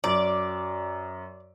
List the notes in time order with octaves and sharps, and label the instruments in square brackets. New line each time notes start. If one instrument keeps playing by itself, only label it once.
[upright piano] F#2 [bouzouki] D5